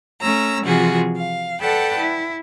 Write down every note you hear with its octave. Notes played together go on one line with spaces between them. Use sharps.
A3 C#4 A#5 E6
C3 E3 F3 F4 F#4 G#4
F5
A4 B4 D5 F#5 G5 A5
E4